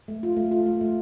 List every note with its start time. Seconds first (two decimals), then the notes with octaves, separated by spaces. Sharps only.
0.08 A3
0.23 F4
0.37 A3
0.51 F4
0.66 A3
0.81 A3